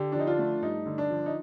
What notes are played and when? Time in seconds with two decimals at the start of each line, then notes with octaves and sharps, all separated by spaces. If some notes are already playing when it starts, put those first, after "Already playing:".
Already playing: D3 G4
0.12 D4
0.15 F3 D#4
0.27 D4 F4
0.39 A3
0.62 G2 D#4
0.86 D3
0.98 D4
1.10 F3
1.26 D#4